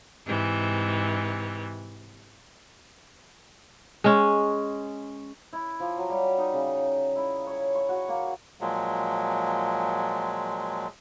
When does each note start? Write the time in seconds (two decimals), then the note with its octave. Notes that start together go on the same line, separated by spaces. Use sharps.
0.25 G#2 C3 E3
4.04 G#3 C#4
5.53 E4
5.80 F3
5.97 F#3
6.09 G3
6.38 D#4
6.53 C#3
7.16 E4
7.47 C#5
7.75 C#6
7.89 F#4
8.08 A#3
8.61 A#2 F3 F#3 G#3